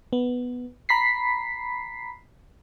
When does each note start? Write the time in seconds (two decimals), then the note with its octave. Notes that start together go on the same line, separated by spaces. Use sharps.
0.13 B3
0.89 A#5 B5 B6 C7